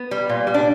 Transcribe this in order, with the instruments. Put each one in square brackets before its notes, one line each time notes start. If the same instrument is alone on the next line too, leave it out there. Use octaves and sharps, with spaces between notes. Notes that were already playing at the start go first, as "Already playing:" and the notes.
Already playing: [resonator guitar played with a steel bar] B3
G3
A#2
G3
D4